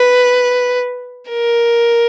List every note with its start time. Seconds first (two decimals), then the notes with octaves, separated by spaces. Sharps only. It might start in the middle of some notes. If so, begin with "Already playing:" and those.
Already playing: B4
1.30 A#4